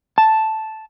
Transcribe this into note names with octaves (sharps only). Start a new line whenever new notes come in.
A5